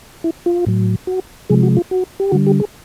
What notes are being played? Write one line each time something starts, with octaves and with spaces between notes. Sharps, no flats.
E4
F4
A2 F#3
F#4
C3 F3 G#3 G#4
F#4
F4
F#4
G4
D3 G3 F#4
G4
G#4